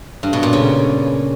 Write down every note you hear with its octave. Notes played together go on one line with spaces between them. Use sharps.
G2
B2
A#2
C#3